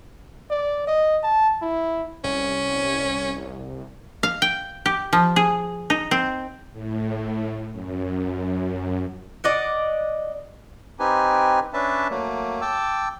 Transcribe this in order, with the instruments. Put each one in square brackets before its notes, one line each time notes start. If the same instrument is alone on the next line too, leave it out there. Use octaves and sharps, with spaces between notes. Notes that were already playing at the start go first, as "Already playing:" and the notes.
[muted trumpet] D5
D#5
A5
E4
[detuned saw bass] C2 [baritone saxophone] C#4
[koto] F5
G5
G4
F3
G#4
D#4
C4
[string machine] A2
F#2
[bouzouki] D5 D#5 F#5
[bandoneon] C4 D#4 G4 B4 G#5
C#4 D4 B4 E5 A5
F#3 A3 A#3
G5 A5 D6 E6